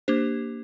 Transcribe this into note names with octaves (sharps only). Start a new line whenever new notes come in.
A#3 D4 G4 C5